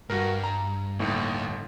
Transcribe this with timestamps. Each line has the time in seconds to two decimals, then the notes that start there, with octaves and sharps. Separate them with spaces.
0.10 G2 F#4 A#4
0.44 A#5
0.99 G1 D#2 A2